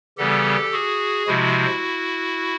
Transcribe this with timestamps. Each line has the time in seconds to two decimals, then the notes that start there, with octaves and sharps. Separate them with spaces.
0.18 C#3 E3 G3 B3 G4 A4
0.73 F#4 G#4
1.27 C3 F3 G#3 E4 F#4